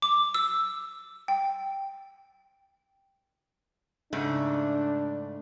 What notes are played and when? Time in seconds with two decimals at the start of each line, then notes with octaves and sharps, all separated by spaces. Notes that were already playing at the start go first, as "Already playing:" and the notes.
0.02 D6
0.34 E6
1.28 G5
4.13 G#2 C#3 A3 D4